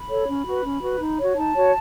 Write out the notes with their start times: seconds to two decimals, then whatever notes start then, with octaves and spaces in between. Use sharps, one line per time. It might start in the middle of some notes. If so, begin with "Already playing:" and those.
Already playing: B5
0.09 A4 C#5
0.27 C#4
0.46 F#4 B4
0.64 C#4
0.82 F#4 B4
1.00 D#4
1.18 F#4 C#5
1.36 D#4 A5
1.54 F#4 C#5